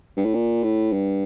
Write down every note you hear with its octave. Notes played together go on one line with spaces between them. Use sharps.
G2
A2
A#2
A2
G2